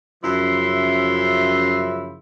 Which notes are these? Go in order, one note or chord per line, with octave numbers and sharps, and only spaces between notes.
F#2 C#3 F3 E4 E5 C6